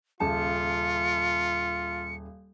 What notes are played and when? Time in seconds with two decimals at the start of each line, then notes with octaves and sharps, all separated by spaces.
0.20 D#1 C#3 F4 A5 C#7